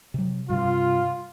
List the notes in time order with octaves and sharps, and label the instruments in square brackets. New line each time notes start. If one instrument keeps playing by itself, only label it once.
[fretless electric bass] C3 F#3
[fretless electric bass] G2 C3 [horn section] F4